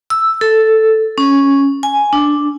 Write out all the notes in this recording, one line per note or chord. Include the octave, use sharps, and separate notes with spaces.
E6
A4
C#4
G#5
D4